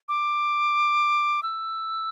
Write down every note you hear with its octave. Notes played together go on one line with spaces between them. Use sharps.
D6
E6